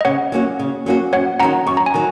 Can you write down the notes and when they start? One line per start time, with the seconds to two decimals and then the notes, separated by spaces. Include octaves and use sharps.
0.01 D#5
0.05 C#3 C#5 F#5
0.32 F#3 A#3 C#4 F#4
0.59 C#3
0.86 F#3 A#3 C#4 F#4
1.12 F#2 C#5 F#5
1.40 D#3 F#3 C#4 F#5 A#5
1.66 F#2 C#6
1.77 A#5
1.86 G#5
1.94 D#3 F#3